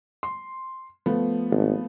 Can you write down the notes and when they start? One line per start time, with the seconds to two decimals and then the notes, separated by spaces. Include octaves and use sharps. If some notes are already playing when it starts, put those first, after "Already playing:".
0.23 C6
1.06 F3 A3 B3
1.51 G#1